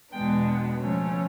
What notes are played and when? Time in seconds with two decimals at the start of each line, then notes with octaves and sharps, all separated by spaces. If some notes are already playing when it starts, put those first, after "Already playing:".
0.13 E2 B2 G#3 B3 D4 G5
0.79 C#3 F3 A3 C#4